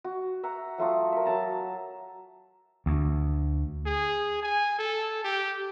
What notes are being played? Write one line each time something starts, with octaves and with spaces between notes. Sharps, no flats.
F#4
E5 F#5 A#5
F#3 A3 F4 D#6
A#4 E5
F#3 A5 A#5
D2
G#4
G#5
A4
G4